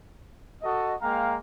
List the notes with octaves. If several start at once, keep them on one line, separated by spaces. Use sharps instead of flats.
F#4 A4 D#5
G#3 A#3 F5 G5 A#5